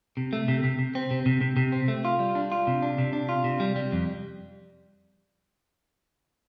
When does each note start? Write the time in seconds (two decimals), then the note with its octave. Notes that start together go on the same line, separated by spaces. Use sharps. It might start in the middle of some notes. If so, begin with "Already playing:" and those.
0.17 C3
0.33 A3
0.48 C3
0.64 C3
0.79 C3
0.95 C4
1.11 C3
1.26 C3
1.41 C3
1.57 C3
1.72 C4
1.88 A3
2.05 F4
2.19 G3
2.35 D4
2.52 F4
2.67 C3
2.82 D4
2.98 C3
3.13 D4
3.29 F4
3.44 C3
3.60 G3
3.76 G3
3.92 F2